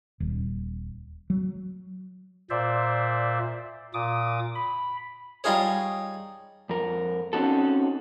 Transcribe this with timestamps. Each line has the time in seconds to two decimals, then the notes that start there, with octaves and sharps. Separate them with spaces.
0.20 D#1
1.30 F#3
2.50 A#2 C5 D5 E5
3.94 A#2 D6 D#6
4.55 B5
5.44 G3 D#4 F4 G#4 C#5
6.69 F2 A#4
7.33 C4 C#4 D#4 F#4 A4